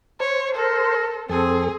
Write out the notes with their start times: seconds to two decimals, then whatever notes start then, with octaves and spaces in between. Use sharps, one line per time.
0.20 C5 C#5
0.55 A4 A#4
1.29 F2 C4 G#4 A4